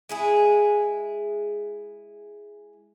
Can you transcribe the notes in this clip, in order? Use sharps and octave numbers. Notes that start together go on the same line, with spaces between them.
G#3 E4 G#4